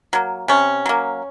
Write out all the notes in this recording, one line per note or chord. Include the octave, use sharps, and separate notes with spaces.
F#3 A#3
C3 C#4
F#3 A#3